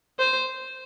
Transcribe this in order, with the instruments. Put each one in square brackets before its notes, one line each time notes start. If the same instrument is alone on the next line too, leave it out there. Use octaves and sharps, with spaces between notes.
[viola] C5